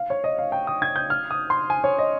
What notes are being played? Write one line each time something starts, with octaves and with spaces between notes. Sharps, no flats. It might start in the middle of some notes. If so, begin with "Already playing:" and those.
Already playing: F5
C#5
D#5
F5
G5
D#6
G#6
G6
F6
D#6
C6
G#5
C#5
D#5